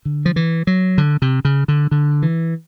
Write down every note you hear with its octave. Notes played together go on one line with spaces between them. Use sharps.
D3
F3
E3
F#3
D3
C3
C#3
D3
D3
E3